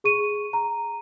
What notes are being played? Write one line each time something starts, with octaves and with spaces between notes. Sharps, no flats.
G#4 C#6 D#7
A#5